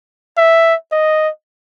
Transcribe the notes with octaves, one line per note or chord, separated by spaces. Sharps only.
E5
D#5